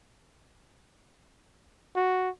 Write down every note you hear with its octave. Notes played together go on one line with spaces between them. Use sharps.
F#4